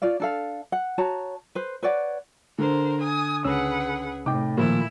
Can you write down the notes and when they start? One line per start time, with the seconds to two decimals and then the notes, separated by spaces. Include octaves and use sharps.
0.02 F4 C#5 D5 F5
0.20 D4 A4 F5
0.72 F#5
0.98 F#4 C#5 A5 A#5
1.55 B4 C5
1.83 B4 C#5 D5 F#5
2.58 D3 A#4 C5
3.02 G#5 D#6
3.45 C#2 C#4 G#4 B4 F#5 E6
4.26 A2 C3 D#4 G5 D6
4.58 A#2 D#3 F3 A#3 E4